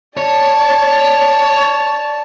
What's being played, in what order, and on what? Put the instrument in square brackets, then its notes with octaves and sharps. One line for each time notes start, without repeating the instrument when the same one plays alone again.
[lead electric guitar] C#5 [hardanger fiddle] D5 A5